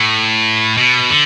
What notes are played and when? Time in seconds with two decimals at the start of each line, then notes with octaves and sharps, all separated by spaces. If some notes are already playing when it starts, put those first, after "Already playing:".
Already playing: A2
0.77 B2
1.09 D3